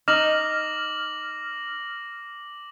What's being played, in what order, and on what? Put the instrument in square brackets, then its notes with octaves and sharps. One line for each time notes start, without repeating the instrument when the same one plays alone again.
[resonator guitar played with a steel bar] D#4 [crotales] D6 A#6 F#7 [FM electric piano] F6